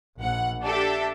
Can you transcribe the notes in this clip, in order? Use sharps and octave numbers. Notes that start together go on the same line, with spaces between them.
A#1 F#5
D4 G4 A4 E5